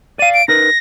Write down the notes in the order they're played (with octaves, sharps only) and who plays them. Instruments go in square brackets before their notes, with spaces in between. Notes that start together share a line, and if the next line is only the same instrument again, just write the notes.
[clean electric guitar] D5 F5 [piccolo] D#7
[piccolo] D7
[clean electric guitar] D#4 A#4 B4 [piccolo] A#6